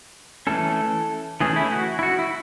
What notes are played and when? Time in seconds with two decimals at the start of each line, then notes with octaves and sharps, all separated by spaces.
0.47 E3 A3 C#4 A4
1.40 E3 A3 C#4 G#4
1.56 E4
1.72 F#4
1.99 E4
2.03 F#4
2.19 E4